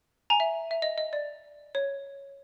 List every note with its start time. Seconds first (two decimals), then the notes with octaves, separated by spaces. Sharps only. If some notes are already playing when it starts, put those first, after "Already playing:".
0.30 G#5 A#5
0.40 E5
0.71 E5
0.82 D#5
0.98 D#5
1.13 D5
1.75 C#5